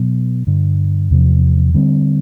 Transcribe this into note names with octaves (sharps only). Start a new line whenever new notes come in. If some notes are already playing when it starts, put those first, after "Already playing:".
Already playing: B2 F#3 B3
G2 D3 G3
E2 C3 F3
D3 G3 C4